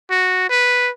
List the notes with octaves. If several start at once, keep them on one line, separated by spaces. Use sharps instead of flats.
F#4
B4